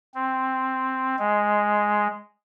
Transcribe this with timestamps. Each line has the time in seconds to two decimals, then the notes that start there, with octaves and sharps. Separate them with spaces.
0.15 C4
1.19 G#3